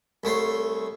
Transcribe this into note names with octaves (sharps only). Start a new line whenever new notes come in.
C2 A3 C#5 C6